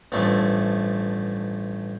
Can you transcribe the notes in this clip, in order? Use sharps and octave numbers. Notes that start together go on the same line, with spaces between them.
A1 G2 F3 A3